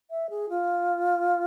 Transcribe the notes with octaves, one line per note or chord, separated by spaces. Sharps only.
E5
G#4
F4